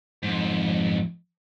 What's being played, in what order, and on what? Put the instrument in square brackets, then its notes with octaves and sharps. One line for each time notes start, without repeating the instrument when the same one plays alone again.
[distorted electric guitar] F2 G#2